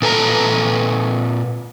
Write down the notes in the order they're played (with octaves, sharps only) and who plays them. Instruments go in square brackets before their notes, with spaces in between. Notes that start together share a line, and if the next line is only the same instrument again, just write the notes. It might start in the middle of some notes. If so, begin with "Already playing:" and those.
[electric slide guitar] A#2 A4 B4 G#5 A#5